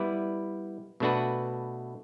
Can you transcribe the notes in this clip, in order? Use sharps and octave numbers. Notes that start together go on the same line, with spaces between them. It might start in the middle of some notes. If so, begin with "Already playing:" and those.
Already playing: G3 B3 E4 B4 D5
B2 A3 D4 F#4 B4